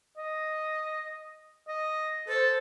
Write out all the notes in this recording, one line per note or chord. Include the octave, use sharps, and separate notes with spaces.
D#5
D#5
A4 C5